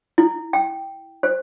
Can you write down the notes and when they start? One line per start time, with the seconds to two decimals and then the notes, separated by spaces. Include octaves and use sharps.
0.18 E4
0.53 G5
1.23 C5